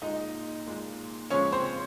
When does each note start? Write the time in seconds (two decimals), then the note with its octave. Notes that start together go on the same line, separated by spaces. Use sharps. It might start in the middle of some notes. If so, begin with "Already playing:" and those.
0.02 A#2 G#3 D#4 D#5
0.66 A#2 G#3
1.30 C#3 F3 G#3 C#4 C#5
1.52 C4 C5